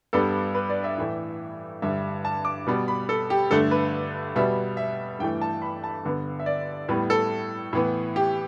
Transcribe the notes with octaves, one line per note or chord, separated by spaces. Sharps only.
G2 G3 B3 A4
B4
D5
E5
A2 E3 A3
G2 D3 G3 E5
A5
D6
B2 G3 B3
B5
A4
G4
G2 D3 A3 A4
B4
B2 G3 B3 E5
E5
G2 E3 A3 G5
A5
B5
A5
G2 D3 B3
E5
D5
A2 G3 B3 B4
A4
A2 E3 B3
G4